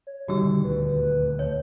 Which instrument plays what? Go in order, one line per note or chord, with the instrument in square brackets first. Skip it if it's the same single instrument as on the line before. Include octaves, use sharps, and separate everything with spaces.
[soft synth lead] C#5
[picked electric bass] E1 D3 D#3 [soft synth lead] G3 [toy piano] F#4 G4 E6
[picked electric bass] D#1 D2 [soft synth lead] B4
[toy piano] C#5